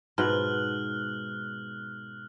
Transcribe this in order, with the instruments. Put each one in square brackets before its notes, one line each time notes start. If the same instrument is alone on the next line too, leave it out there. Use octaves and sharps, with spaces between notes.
[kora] G#2 B2 [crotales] F6 F#6 F#7